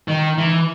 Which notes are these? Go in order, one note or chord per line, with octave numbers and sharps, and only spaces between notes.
D#3
E3